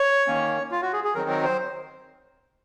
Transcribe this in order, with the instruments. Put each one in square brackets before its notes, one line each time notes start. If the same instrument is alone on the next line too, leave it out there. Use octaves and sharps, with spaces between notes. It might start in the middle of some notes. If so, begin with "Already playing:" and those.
Already playing: [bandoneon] C#5
D#3 A#3 C#4
F4
F#4
G#4
G#4
D#3 F#3 C4 D#4 A#4
A#4
C5